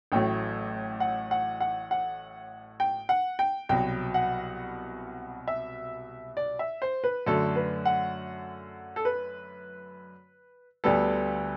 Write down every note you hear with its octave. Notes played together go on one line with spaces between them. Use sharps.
A1 A2 F#3 A3 G5
F#5
F#5
F#5
F#5
G5
F#5
G5
C2 B2 F#3 G5
F#5
E5
D5
E5
C5
B4
F#2 D3 A3 A4
B4
F#5
A4
B4
D2 D3 G3 B3 A4